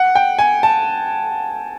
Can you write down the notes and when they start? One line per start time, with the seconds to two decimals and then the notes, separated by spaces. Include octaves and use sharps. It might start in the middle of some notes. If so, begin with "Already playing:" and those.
Already playing: F#5
0.15 G5
0.39 G#5
0.63 A5